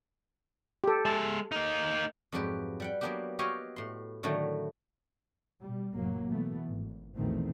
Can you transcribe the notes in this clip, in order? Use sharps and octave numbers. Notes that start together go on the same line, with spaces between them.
G4 A4
G#3 E5 A5
A#3 D#4
F2 G#2 F#3 G4 B4
G3 F#5 G5
F#3 G3 A#3 B3 D4 G4
F#4 G4 C#5 D#5 F5 G#5
A2 C6
A2 D3 D#3 F#3 A3
B2 G3
F1 A2 F#3 A#3
B2 E3 A3 B3
G#1
A#1 E2 B2 D#3 A3 C4